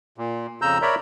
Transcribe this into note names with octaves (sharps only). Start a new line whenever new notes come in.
A#2
F2 C#3 A#5 E6 G6
A#4 C#5 D5 E5 A#5 B5